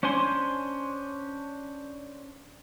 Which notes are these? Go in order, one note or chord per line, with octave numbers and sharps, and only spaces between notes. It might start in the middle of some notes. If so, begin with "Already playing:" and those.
C#4 D4 C5 G#5 C6